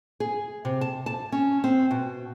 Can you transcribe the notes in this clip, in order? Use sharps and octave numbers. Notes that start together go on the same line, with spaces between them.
G#4
C3
A5
A5
C#4
C4
B2